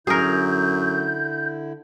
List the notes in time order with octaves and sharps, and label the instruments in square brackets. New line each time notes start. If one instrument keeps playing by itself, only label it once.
[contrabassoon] F#2 [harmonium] D3 E4 [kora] G#4 A#4 [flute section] G6